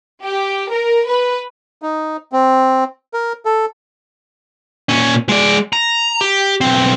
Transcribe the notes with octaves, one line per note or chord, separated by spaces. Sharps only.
G4
A#4
B4
D#4
C4
A#4
A4
A#2 C#4
G#3 D5
A#5
G4
B1 C4